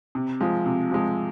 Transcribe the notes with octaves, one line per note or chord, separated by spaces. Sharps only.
C3
F3 G#3
C3
F3 G#3